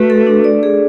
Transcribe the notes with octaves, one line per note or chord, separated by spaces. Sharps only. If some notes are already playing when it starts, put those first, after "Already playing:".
Already playing: A3 F#4 B4
A4
D4
D5
G#4